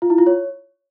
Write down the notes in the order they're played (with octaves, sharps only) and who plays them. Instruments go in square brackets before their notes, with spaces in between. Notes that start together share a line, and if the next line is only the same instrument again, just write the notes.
[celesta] F4
E4
F4
C#5